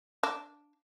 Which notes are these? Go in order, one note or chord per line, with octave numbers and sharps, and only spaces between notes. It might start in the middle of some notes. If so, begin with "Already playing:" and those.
D4